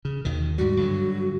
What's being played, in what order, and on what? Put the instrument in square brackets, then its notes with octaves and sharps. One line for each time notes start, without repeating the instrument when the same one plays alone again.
[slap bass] C#3
D#2 B2 D#3
[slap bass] G#2 G3 [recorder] F#4
[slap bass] G2 D3 F#3